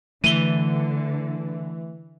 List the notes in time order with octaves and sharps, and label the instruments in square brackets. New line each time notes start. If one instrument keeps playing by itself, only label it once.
[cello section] D3 [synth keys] E3 [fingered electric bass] A3 [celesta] D#7 G7